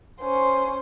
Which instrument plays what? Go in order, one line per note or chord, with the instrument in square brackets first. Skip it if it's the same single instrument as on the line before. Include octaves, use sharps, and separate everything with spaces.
[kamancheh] C#4 C5